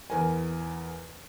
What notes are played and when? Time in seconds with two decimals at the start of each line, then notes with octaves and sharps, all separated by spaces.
0.10 E2 A#4 G#5